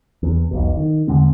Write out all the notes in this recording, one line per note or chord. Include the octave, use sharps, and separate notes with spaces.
E2
E1 B1 B2
D#3
E2 D3 G#3 C4